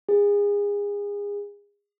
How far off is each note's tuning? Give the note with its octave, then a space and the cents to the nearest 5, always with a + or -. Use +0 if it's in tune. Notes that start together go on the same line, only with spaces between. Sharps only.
G#4 -30